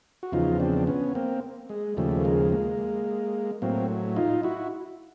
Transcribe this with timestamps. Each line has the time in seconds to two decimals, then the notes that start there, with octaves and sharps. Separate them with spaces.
0.23 F#4
0.32 E2 C#3 F3 D#4 F4
0.60 C4 D4
0.87 B3 C#4
1.15 A#3 C4
1.69 G#3
1.97 D#2 C#3 F3 G3 A3
2.24 G#3 A#3
2.52 G#3 A#3
3.62 A2 F#3 A#3 C4
4.16 D#4 F4
4.43 E4 F#4